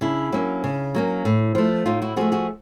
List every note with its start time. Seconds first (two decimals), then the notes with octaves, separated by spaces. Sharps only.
0.01 C#3 D4 E4
0.32 F#3 A#3 C#4
0.64 C#3
0.94 F#3 A#3 C#4
1.25 A2
1.55 F3 A3
1.86 A2 D#4 F4
2.02 E4 F#4
2.16 F3 A3 F#4 G#4
2.32 F#4 G#4